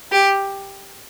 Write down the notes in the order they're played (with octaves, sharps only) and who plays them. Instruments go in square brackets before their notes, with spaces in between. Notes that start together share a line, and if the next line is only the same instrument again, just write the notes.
[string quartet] G4